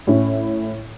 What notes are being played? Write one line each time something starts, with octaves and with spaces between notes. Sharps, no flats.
A2 C#4 E4